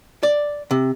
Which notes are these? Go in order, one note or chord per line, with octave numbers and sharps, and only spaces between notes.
D5
C3